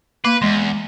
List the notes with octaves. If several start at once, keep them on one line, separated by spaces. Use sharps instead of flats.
A#3 B4
E2 G#3